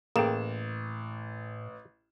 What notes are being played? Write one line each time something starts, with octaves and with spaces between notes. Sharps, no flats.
A1 A2 A#3 G#4 A4 G5 E7